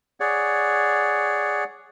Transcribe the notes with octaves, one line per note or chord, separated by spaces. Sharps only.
G#4 C#5 D5 F#5